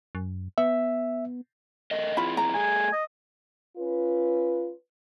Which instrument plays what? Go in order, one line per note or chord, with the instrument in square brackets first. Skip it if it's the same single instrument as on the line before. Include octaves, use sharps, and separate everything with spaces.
[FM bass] F#2
[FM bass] B3 [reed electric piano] E5
[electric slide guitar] A3 A#4 D#5
[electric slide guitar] C4 E4 G#4 [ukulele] F4 B5
[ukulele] A#5
[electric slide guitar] A3 G#4 [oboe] G#5
[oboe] D#5
[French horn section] C#4 F4 B4